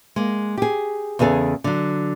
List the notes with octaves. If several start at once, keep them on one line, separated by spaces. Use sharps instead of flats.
G#3 A#3
G4 G#4
E2 C#3 B3 G#4 A4
D3 F#3